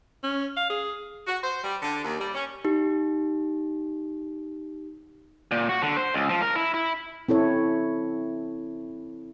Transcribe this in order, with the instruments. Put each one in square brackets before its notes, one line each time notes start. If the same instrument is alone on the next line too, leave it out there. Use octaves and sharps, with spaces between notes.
[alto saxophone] C#4
F5
G#4
[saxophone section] F#4
C5
G3
D3
D#2
G3
C#4
[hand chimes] D#4 G4
[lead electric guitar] A#2
F#4
D3
C5
C#2
F3
A#4
E4
E4
[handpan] C4 E4 A4 C#5